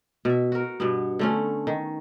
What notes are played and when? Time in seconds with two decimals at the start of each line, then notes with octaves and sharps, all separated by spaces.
0.25 B2 E5
0.52 F#4 A#4
0.80 G2 B2 B3
1.19 D3 A3 C#4
1.67 D#3